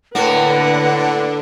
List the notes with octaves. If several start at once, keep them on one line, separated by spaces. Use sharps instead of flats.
A2 D3 A#3 D4 B4 F#5